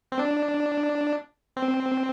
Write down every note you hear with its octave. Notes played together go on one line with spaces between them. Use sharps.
C4
D4
C4